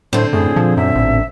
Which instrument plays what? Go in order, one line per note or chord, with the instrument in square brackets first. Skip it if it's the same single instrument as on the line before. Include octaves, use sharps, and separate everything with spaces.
[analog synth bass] A2 [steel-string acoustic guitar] D3 C4 [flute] C5
[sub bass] F#2 [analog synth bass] A2 [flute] G#4
[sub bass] A#2 [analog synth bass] F3
[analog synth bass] F#2 [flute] E5
[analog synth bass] A1